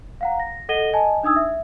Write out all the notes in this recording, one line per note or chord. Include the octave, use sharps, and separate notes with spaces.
F5 F#5 A#5
A#6
A4 D#5 F#5 A#6 D#7 G7
D#5 G#5 A5
D4 D#4 D#6 E6 G#6
E5